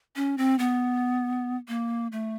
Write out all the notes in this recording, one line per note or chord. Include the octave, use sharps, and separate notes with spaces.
C#4
C4
B3
A#3
A3